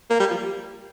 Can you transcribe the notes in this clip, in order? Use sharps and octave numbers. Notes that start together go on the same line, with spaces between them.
A#3
G3
F3